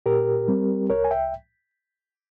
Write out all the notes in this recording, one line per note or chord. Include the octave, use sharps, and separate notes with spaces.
A#2 G4 A#4
G3 C4
C2 A#4 C#5
G#5
E5 G5